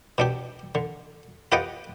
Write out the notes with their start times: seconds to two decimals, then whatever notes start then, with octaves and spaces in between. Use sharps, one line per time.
0.18 B2 D4 G4
0.75 D3
1.52 F4 G4 B4 D#5 F#5 G5